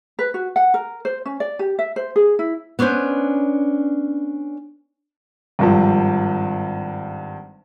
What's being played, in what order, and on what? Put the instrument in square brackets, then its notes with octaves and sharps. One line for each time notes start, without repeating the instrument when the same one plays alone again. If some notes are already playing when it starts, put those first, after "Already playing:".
[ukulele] B4
F#4
F#5
A#4
C5
C#4
D5
G4
E5
C5
G#4
E4
[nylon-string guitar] B3 C#4 D4 B4 C5
[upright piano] G#1 G2 F3